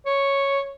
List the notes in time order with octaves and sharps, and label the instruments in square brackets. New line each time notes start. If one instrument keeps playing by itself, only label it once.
[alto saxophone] C#5